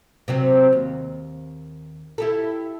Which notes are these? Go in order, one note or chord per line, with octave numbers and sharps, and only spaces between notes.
C3 F#3 C4
D#2
E4 G4 A4